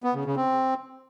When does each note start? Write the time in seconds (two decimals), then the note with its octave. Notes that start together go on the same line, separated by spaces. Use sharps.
0.03 B3
0.14 C#3
0.25 C#3
0.36 C4